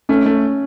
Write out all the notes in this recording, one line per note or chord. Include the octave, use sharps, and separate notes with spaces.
A3 C#4
A3